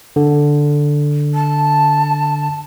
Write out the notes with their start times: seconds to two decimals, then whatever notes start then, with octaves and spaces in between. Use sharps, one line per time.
0.16 D3
1.34 A5